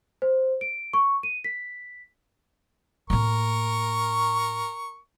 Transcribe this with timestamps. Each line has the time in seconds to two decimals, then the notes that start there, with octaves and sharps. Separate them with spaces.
0.22 C5
0.61 D7
0.93 C#6
1.23 D#7
1.44 B6
3.10 A2 A#3 A#4 C#6